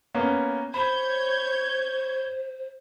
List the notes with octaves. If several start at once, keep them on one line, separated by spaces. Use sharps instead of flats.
A#3 B3 C#4
C5 C#5 B5 G6 G#6